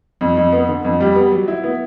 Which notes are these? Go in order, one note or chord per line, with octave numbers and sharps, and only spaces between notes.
F2
F2
B3
D3
F2
G3
B3
F#3
E4
B3